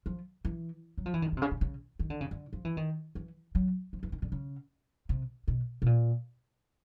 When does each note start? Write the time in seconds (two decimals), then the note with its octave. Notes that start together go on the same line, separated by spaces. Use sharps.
0.06 F3
0.45 E3
0.98 F#3
1.06 F3
1.14 E3
1.22 D#3
1.32 D3
1.37 C3
1.42 C#3
1.51 C3
1.61 C#3
1.99 D#3
2.10 D3
2.21 C#3
2.31 D3
2.53 F3
2.65 E3
2.77 D#3
3.15 E3
3.55 F#3
3.93 F3
4.03 E3
4.12 D#3
4.22 D3
4.32 C#3
5.09 C3
5.48 B2
5.82 B2
5.86 A#2